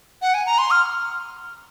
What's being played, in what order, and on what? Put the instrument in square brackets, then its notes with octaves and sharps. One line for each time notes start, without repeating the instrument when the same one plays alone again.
[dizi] F#5
G#5
A#5
C6
F6